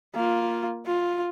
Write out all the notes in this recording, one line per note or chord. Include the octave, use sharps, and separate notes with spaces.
A#3 F4
F4